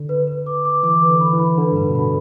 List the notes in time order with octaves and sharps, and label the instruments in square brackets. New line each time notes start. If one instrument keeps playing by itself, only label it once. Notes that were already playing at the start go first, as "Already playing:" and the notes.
Already playing: [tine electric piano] D3
[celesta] B4
B4
D6
D6
[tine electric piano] E3 [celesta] D6
[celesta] B4
[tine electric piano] D3
[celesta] B5
[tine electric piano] E3
[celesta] B5
[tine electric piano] D3 [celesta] B4
[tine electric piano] G2
[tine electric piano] A2 [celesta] B4
[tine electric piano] B2
[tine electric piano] D3 [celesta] B5